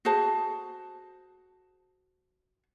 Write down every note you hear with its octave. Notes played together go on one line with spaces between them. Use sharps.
F#4 G#4 C5 A5